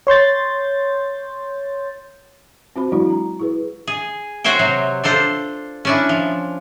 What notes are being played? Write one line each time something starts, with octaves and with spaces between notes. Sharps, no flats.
C#5 C6 G6 A6
C4 F4 F#4 C5 B5
E3 F#3 G#3 D4 E4 F#4
A#5
E4 G#4 B4
G#4
F#4 C5 C#5 E5 G5
C3 F#3
D4 F4 A4 C5
C#4 D4 E4
F3